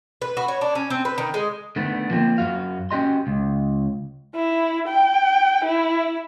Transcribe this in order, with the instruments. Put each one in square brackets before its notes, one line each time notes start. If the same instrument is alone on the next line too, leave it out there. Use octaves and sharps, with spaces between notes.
[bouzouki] B4
F#4
C#5
D4
C#4
C4
B4
D#3
G#3
[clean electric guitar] D3 D#3 A3 B3
F3 A#3 C4 D#4 F4
F#2 F#4 F5
C#4 F#4 G4 D#5 C6
C#2
[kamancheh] E4
G5
E4